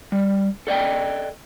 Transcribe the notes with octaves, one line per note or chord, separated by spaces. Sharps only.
G3
A4 D5 D#5 G5